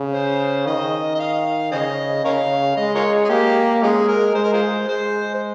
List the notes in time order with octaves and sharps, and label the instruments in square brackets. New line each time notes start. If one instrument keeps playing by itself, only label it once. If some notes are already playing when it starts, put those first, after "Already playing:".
Already playing: [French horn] C#3
[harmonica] C5
[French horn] D#3 [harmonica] D#5
[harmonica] D#5
F5
[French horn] C#3 [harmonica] G#4 C5 D#5
[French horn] C#3 [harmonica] A#4 C#5 F5
[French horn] G#3 [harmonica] D#5
[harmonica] F4 A#4 C#5
G#4
[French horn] A#3 [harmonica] G4
[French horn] G#3 [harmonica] C#4 F4 G#4
[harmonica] A#4
[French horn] G#3 [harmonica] C5
[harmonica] A#4
F4 G#4 C5
[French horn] G#3 [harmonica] C5
[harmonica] C5